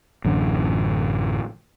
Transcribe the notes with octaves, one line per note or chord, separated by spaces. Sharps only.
A1 F#2 D3